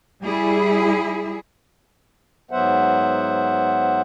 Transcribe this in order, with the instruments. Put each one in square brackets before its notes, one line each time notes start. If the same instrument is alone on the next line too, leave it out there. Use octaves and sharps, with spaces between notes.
[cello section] G3 E4 G#4
[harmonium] G#2 F#3 B3 C5 E5 F#5